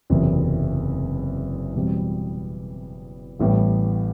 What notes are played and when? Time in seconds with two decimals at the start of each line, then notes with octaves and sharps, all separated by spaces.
0.10 F#1 E2 C3 F#3
1.75 E2 B2 G3 C4
3.39 A1 A2 G3 B3